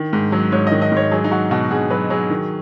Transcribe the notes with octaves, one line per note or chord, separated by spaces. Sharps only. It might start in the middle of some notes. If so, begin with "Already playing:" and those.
Already playing: D#3
G#2
F#3
G#2 C#5
D#3 D#5
D#5
G#2 C#5
F#3 G#4
D#4
F#3 F#4
B2 F#4
B2 G#4
F#3 B4
F#3 G#4
D#3